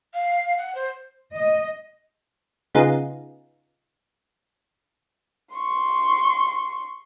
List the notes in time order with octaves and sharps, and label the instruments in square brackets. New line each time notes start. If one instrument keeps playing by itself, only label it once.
[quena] F5
F#5
C5
[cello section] D#5
[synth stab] C#3 B3 D#4 F4 G#4
[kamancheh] C6 C#6